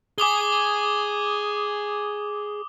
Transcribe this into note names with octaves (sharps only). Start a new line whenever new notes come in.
G#4 G#5 D6 D#6 G7